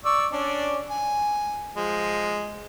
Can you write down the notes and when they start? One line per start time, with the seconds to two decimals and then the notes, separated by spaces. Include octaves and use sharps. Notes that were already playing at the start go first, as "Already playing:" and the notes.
0.05 D5 C#6 E6
0.32 C#4 D4 D5
0.90 G#5
1.76 F3 G#3